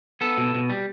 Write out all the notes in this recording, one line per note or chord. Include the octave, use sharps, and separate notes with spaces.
B3 A4
B2
B2
G3